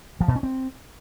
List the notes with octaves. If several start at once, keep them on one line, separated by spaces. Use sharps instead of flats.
F3
B2
C#4
C4